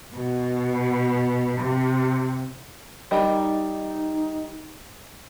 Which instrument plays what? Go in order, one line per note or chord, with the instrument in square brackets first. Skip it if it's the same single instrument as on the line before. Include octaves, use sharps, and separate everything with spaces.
[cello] B2
C3
[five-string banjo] G3 A#4 D#5 [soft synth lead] D#4